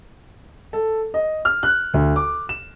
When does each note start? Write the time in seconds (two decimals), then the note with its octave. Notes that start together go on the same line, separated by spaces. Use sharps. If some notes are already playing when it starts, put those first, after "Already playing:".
0.73 A4
1.14 D#5
1.45 F6
1.63 F#6
1.94 D2
2.16 D6
2.49 E7